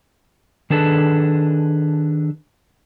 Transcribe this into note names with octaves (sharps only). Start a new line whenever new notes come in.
D#3 D4 G#4 A4 B4